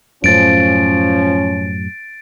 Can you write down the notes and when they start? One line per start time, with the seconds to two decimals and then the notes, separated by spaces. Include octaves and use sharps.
0.24 F#2 A2 F3 C#4 A6 D7